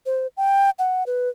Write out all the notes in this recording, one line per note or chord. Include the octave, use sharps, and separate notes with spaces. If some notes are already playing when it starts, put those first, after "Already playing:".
C5
G5
F#5
B4